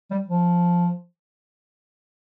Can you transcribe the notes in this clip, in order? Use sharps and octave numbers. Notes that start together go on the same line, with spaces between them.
G3
F3